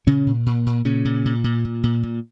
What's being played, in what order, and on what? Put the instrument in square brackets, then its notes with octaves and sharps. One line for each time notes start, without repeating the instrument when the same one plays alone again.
[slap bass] A#2 C#3 C#4
A#2
A#2
A#2
A#2 C#3 C#4
A#2
A#2
A#2
A#2
A#2
A#2